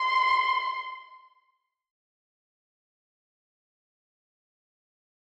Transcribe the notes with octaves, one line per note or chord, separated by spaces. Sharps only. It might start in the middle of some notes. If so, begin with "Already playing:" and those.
Already playing: C6